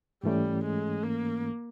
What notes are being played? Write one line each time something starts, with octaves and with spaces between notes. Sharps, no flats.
G#2 E3 G3 A3 C#4
G#3
A#3